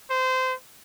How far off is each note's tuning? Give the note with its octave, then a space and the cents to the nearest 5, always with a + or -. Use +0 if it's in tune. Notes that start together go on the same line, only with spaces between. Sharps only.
C5 -20